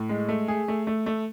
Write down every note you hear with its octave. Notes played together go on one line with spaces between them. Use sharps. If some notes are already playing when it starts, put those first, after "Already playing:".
Already playing: A2
G#3
A3
G#4
A3
A3
A3